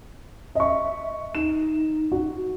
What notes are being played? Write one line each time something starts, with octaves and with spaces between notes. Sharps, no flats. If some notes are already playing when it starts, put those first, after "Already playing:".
D#5 E5 C#6
D#4 E7
F#4